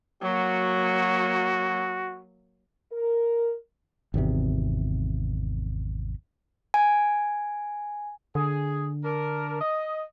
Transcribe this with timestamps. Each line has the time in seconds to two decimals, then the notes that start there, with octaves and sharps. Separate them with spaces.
0.22 F#3 A#3 F#4
2.91 A#4
4.14 G#1 E2 C3
6.74 G#5
8.35 D3 G#4
9.03 D4 A#4
9.59 D#5